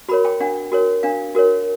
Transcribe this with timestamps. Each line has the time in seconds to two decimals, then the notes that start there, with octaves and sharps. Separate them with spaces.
0.09 F#4 A#4 C#5 B5
0.25 G5
0.40 D4 F#5
0.72 F#4 A#4 C#5
1.03 D4 F5
1.35 F#4 A#4 C#5